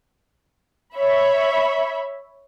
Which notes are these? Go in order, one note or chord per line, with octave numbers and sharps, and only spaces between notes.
C#5 E5 B5